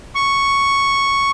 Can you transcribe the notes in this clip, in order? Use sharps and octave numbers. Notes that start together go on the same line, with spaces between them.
C#6